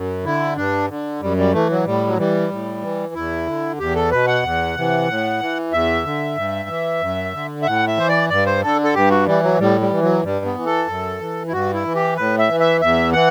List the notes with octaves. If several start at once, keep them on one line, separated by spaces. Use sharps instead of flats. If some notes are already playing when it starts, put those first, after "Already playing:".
Already playing: F#2
D3 E4
G2 D4
D3
F#2 G3
G3
E3 A3
F#3
A2 G3
F#3
E3 G3
A2
E3
E2 E4
D3
E2 G4
A4
B2 B4
F#5
E2
C3 E3
A2
E3
E2 E5
D3
G2
E3
F#2
D3
E5
A2 F#5
E5
E3 C5
D5
G2 D5
C5
D3 A4
A4
G2 G4
F#4
E3 G3
F#3
A2 G3
G3
E3
F#3
G2 G3
B3
E3
A4
F#2
E3
E4
G2 F#4
E4
E3
G4
A2 B4
E5
E3
E5
E2 E5
E3 F#5